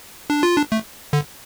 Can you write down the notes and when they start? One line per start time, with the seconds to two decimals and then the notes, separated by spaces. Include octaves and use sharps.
0.30 D4
0.43 F4
0.57 D4
0.72 A3
1.13 D3